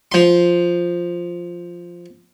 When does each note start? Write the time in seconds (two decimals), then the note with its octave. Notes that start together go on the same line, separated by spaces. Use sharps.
0.12 F3 C6